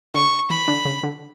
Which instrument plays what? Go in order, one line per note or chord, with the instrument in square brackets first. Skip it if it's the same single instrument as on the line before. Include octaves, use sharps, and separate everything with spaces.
[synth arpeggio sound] D3 [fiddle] C#6
[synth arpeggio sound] E3 [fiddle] B5
[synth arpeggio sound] D3
C#3
D3